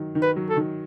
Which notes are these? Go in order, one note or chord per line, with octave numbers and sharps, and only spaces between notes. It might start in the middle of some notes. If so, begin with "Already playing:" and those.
Already playing: D#3 F#3
D#3
B4
F#3
A4
D#3